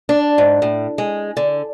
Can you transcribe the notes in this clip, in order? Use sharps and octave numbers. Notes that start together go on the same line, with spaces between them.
D4
G#2
A2
G#3
D3